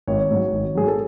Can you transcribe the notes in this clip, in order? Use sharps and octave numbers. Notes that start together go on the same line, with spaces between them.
G#1 C#5
G#2 F#3
G#1
G#2 F#3 G#4
A4